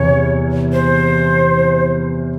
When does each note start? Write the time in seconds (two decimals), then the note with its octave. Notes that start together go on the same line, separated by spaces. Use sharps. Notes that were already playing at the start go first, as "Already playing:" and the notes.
Already playing: E2 C3 C#5
0.73 C5